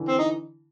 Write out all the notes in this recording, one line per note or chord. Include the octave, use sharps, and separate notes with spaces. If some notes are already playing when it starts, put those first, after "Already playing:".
Already playing: D3 E3
C4
D#4